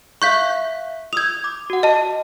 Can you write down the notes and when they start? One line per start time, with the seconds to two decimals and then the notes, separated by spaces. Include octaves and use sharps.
0.22 E5 F5 C#6 F#6 G6 B6
1.13 D#6 E6 G6 G#6 F7
1.44 D6
1.70 F#4 F#5
1.83 D#5 A5